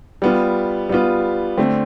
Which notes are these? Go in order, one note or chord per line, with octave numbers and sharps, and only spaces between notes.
G3 B3 F4
G3 B3 F4
D3 A3 C4